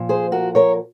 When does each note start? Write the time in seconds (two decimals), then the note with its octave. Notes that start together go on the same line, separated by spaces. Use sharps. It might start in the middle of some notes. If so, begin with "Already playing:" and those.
Already playing: A#2 F3
0.09 G#4 C5
0.32 F#4 A#4
0.55 A#4 C#5